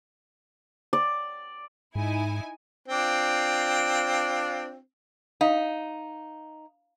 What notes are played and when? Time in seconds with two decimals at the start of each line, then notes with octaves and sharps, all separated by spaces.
0.93 D5
1.95 G#2 D#4 E4 G#5
2.88 C4 D4 F4
5.41 D#4 F5